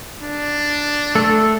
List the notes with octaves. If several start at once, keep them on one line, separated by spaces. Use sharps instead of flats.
D4
A3 A4